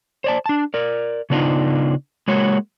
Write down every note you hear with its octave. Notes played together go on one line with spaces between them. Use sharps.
C5 D5 A5
D4 A5
A#4 D5
C#3 B3 D4 D#4 F4
G#3 A#3 F#4 C#5